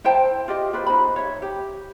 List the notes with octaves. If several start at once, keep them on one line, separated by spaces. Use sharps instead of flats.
E4 C5 G5 A5
F4 G4 D#5
F4 G4 B4 C5
D#4 C5 B5
C#5 E5
G4